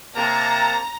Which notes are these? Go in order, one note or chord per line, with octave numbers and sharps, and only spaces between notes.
C3 A#3 A5 A#5